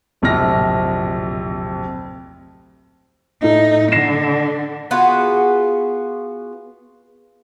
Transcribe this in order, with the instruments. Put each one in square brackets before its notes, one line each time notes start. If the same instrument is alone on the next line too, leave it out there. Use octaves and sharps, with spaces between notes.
[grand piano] D1 A#1 F2 C3 F6 A#6
[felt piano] A2 A3 [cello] D#4
[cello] D3 [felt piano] A#6 C7 E7
[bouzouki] B3 F4 F#4 G#4